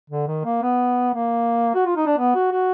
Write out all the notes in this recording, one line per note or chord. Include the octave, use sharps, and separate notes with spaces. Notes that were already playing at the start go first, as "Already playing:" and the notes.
D3
D#3
A#3
B3
A#3
F#4
F4
D#4
D4
B3
F#4
F#4